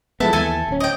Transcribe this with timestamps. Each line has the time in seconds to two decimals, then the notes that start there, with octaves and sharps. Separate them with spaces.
0.20 F3 G#3 B3 E4 A4 A5
0.33 D#2 E3 B3 A4 E5 G#5
0.68 D1 C#4
0.80 D#5 G5